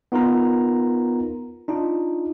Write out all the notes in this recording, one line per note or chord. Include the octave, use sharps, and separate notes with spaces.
B3 D#4 F4 A#4 A#5
D4 D#4 F4